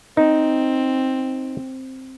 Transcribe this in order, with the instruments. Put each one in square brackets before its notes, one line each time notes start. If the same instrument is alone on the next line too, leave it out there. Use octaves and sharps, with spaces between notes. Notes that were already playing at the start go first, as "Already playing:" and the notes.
[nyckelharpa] C4 [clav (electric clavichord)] D#4